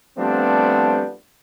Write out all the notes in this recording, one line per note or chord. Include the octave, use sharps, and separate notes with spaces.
F3 G3 A3 B3 C4 D4